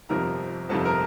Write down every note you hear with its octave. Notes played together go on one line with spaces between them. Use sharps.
G1 F2 C3 F3 A#4 A#5
G1 F2 C3 F3 A4 A5
A#4 A#5